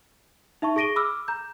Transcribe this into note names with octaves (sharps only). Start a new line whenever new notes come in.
D#4 E5 A5 C#6
G#4 C#6 A#6 D7 D#7 G7
B5 D6 E6 F6
A#5 G6